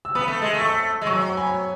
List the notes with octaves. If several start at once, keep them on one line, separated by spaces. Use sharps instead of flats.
E6
B3 B5 D#6
A3
G#3
A3
C#6 E6
G#3
F#3 C#6 E6
G#5 B5